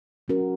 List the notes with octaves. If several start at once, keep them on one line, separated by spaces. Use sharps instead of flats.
F#3 C#4 F#4 A#4